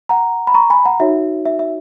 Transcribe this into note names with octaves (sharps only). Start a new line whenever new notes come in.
F#5 A#5
B5
A#5 C#6
G#5 B5
F#5 A#5
D#4 F#4 C#5 E5
E5
E5